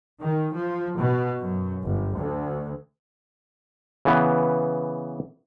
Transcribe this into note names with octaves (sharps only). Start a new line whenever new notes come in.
D#3
F3
B2
F#2
G1
D2
C#3 E3 B3